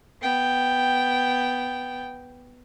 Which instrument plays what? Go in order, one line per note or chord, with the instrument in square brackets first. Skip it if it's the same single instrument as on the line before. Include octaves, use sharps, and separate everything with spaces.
[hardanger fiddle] B3 G5